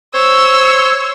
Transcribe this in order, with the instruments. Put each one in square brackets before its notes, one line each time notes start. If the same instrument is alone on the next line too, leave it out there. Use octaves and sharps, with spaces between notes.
[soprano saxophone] C5 [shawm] C#5 [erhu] E6